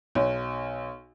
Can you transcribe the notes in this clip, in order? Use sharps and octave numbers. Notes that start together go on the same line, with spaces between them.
B1